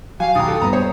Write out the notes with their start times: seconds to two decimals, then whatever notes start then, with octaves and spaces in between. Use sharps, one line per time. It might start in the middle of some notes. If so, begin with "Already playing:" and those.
0.20 F#3 F5 G#5
0.35 D#2 G4 A#5 D#6
0.47 A2 A4 G5
0.62 G2 B3 A#5
0.73 C5 C#5